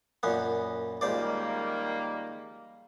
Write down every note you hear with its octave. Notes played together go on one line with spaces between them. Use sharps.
F#2 A#2 B3
C#2 D#3 G3 A#3 C5 D5